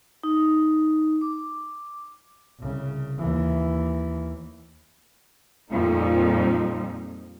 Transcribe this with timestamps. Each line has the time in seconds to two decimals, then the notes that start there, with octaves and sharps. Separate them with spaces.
0.24 D#4
1.21 D6
2.60 C2 C#3
3.18 D#2 E3
5.72 F2 A#2 F3 G3 D#4